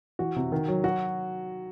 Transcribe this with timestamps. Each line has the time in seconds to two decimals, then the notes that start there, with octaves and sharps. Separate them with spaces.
0.19 E3 F#4
0.36 C3
0.52 D#3
0.68 F#3
0.84 F#4